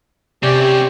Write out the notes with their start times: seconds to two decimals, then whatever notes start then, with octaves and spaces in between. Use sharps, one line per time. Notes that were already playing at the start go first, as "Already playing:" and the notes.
0.43 C3 C4 C#4 G4 D5 C#6
0.61 G4 C#6